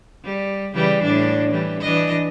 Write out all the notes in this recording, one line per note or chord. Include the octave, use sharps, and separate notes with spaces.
G3
C#3 E3 G3
A2 D4
E3 G3
E3 D4 D#5